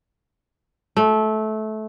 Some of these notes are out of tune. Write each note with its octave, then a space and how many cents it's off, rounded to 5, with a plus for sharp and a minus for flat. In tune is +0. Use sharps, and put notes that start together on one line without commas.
A3 -20